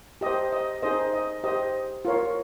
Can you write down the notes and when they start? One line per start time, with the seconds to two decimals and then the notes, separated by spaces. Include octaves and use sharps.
0.21 G4 C5 D#5
0.53 D#5
0.82 D#4 G#4 C5 D#5
1.13 D#5
1.44 G4 C5 D#5
2.05 F4 A#4 C#5